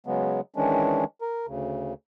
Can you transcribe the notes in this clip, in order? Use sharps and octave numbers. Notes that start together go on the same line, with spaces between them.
C#3 F#3 G#3 B3
D#3 E3 G#3 C#4 D4
A#4
D2 C#3